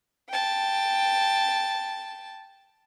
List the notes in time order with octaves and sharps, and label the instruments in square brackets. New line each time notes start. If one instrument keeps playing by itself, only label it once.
[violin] G5 A5